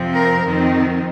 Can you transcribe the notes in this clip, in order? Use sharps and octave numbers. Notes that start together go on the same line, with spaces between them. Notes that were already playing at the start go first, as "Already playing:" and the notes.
Already playing: F2 C3 F3 C4
A#4
F2 D#3 C4